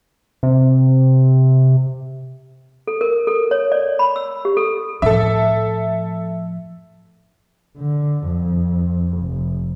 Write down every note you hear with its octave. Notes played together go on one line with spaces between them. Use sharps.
C3
A4
A#4
A4
C#5
D5
B5
E6
G4
A4
A2 F3 A4 E5
D3
F2
F1